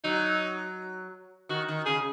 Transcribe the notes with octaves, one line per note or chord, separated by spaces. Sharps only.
F#3 D#4
D#3 F#4
D#3
C#3 G#4